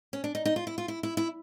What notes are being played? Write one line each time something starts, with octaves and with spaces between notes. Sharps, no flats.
C#4
D4
D#4
D#4
F4
E4
F4
E4
E4
E4